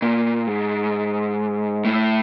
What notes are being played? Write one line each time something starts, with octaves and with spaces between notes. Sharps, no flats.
A#2
G#2
A2